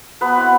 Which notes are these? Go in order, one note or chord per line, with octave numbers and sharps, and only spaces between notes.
F#3 B3 B4
C4 E4